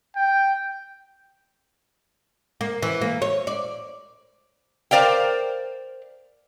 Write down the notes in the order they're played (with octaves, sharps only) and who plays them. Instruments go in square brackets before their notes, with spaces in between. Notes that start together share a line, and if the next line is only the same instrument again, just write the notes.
[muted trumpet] G5
[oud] A#3
E3
A#3
C#5
D5
[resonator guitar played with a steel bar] A#4 C5 D5 F5 G5